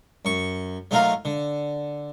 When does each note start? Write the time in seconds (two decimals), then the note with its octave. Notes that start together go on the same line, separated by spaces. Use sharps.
0.25 F#2 C#6
0.91 F#3 A3 D#4 F4 A#4 F5
1.25 D3